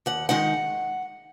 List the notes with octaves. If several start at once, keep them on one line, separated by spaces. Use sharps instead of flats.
D#2 F#5
D#3 G#3 D#4 F#5